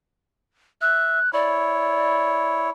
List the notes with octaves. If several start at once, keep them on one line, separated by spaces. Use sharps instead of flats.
E5 F#6
E4 C#5 D5